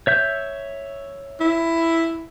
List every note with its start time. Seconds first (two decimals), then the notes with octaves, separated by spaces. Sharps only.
0.07 C#5 E5 G6
1.40 E4